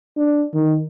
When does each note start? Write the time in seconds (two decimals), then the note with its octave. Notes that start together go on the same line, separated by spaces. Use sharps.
0.17 D4
0.54 D#3